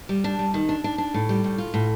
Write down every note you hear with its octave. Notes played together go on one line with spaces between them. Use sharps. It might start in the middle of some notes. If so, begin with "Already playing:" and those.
G3
D4
G3
D#3
D4
D4
D4
A2
G3
A2
F4
A2